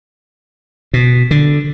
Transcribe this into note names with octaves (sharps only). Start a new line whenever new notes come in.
B2
D3